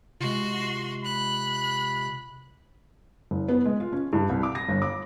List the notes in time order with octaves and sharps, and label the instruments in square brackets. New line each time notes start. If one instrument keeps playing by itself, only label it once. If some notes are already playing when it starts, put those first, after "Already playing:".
[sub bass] C3 [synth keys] G#3 F4 [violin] F#4 C6
[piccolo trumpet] B5 [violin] F#6
[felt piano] F#1
B3
G#3
F4
C#4
G2
C2
D6
A#6
G1
D6